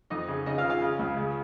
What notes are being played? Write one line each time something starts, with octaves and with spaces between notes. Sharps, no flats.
F2 D#4 D#5
C#3
C#3 D#4 D#5
F4 F5
C#3
F4 F5
C#3
C#2
C#3